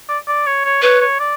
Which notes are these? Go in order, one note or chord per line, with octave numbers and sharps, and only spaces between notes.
D5
D5
C#5
C#5
B4 C#5
C#5
D5